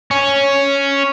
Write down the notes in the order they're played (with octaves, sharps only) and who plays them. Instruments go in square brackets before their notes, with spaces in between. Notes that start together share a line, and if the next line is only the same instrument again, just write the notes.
[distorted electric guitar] C#4